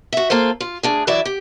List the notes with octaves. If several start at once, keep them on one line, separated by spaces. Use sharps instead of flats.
F#4 E5
A#3 F4 A4 C5
F4
D2 D4 G#4
E3 F#3 E4 D5 E5
G4